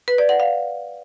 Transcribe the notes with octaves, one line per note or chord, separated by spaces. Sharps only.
B4
D5
F#5
F5